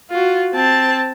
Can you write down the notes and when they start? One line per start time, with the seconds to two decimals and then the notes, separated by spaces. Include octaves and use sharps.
0.10 F4 F#4
0.53 C4 A5